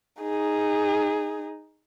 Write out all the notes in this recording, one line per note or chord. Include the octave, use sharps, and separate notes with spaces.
D#4 G#4